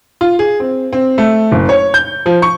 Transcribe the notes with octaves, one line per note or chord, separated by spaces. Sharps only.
F4
G#4
C4
C4
A3
F#1
C#5
G6
F3
C#6